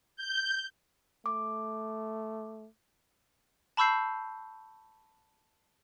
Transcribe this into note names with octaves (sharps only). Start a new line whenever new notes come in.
G6
A3 D6
A5 B5 C#6 E6 G6 C7